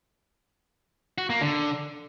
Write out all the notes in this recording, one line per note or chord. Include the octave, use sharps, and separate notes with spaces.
F#4
A#3
D3